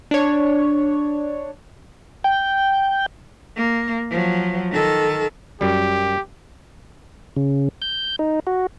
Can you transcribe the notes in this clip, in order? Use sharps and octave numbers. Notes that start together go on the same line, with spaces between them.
D4 C#5
G5
A#3
F3 F#3
D#3 A4
F#2 G3 G4
C#3
G6
D#4
F#4